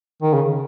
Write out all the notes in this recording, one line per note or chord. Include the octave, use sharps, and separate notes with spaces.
D#3
C#3